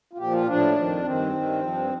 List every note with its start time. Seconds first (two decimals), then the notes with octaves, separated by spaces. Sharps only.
0.13 F4
0.18 A#2 F3 G4
0.33 F4
0.47 A2 F3 D4
0.76 F2 D#3
1.03 G2 D#3 C4
1.32 G2 D#3
1.61 G2 F3